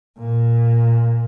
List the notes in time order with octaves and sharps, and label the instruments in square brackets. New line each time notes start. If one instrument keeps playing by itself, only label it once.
[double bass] A#2